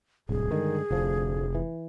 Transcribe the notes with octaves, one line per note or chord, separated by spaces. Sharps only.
D1 C2 G#4
G2 D3 D#3 G#3
F1 D2 F3
E3